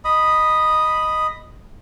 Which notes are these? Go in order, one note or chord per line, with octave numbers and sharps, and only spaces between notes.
D#5 B5 D#6